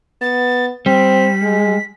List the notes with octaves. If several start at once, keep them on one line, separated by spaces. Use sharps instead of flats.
B3 A6
G3 C4 B6
G#3